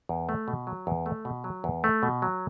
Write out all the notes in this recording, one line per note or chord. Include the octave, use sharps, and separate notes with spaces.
E2
A3
B2
F#3
E2
A3
B2
F#3
E2
A3
B2
F#3